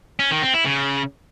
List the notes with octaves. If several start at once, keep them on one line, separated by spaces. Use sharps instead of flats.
C#4
D#3
C4
E4
C#3